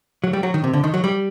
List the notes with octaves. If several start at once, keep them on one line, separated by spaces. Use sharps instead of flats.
F#3
G3
F#3
D#3
C3
D3
D#3
F#3
G3